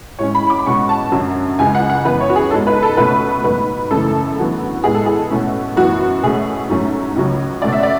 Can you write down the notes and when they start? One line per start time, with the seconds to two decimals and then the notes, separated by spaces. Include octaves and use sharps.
0.19 A2 G#3 C#4 C#5
0.35 B5
0.50 D6
0.59 B5
0.66 B2 G#3 C#4 C#6
0.89 A5
1.12 F#2 D3 F#3 C#4
1.59 C#2 C#3 G#3 G#5
1.75 F#5
1.90 F#5
2.05 F#2 E3 B3 B4
2.20 C#5
2.30 F#4
2.36 G#4
2.51 G#2 G#3 B3 A4
2.67 B4
2.82 A4
2.97 C#2 B2 A3 C#4 B4
3.44 G#2 F#3 B3 B4
3.91 F#2 C#3 E3 A3 A4
4.37 E2 D3 F#3 B3
4.84 A2 G#3 B3 G#4
4.95 A4
5.06 G#4
5.30 B2 A3 C#4
5.76 F#2 E3 B3 F#4
6.22 B2 A3 C#4 G#4
6.69 G#2 F#3 A3 C#4
7.16 C#2 C#3 F#3 C#4
7.62 B2 A3 C#4 D5
7.72 E5
7.83 D5